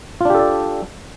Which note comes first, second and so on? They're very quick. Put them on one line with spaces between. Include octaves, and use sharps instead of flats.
F4 D4 G4 A4 D5